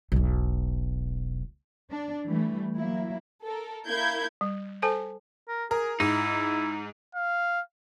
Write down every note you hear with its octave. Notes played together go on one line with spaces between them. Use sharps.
E1 B1
D4
E3 G3 A3
F#3 A#3 E4
A4 A#4
A#3 E4 G6 G#6
G3
A4 C5 G#5 A5
A#4
G#4 A#4
G#2 D#4 E4
F5